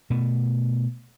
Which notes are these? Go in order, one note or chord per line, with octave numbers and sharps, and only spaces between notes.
B2 A3